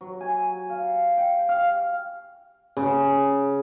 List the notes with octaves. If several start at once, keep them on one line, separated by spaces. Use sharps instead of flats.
F#3
G#5
F5
G5
F5
C#3